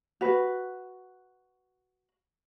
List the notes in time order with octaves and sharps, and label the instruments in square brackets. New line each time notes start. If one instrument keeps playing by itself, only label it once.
[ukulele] F#4 B4